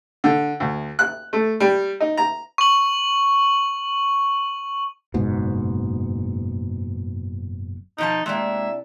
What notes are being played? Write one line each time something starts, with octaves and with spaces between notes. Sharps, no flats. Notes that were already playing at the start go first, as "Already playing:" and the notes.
D3
D2
F#6
A3
G3
D#4
A#5
C#6 F#7
F#1 G#2 B2
B2 F3 D#4 A5
C3 G#3 A#3 D4 E4 E5